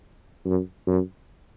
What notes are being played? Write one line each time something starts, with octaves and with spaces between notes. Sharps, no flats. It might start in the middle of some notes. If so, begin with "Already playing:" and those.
F#2
F#2